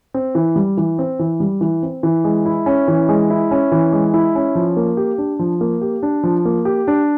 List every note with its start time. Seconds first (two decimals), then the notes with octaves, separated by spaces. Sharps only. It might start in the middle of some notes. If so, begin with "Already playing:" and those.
0.14 C4
0.35 E3
0.56 G3
0.77 E3
0.99 C4
1.19 E3
1.40 G3
1.61 E3
1.83 C4
2.03 E3
2.24 G#3
2.46 E4
2.66 C#4
2.88 E3
3.09 G#3
3.30 E4
3.51 C#4
3.72 E3
3.93 G#3
4.14 E4
4.35 C#4
4.55 F3
4.77 A#3
4.97 G4
5.18 D4
5.39 F3
5.61 A#3
5.81 G4
6.03 D4
6.23 F3
6.45 A#3
6.65 G4
6.88 D4